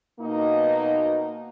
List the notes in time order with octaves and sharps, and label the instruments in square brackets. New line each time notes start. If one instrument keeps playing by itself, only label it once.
[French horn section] B2 A#3 D#4